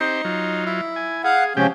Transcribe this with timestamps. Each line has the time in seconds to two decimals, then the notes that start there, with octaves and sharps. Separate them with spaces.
0.01 C4 D#4 G4 C5
0.25 F#3 F4
0.66 E4
0.96 G#5
1.24 G#4 F5 F#5
1.57 C3 F3 G#3 C#4 G4 G5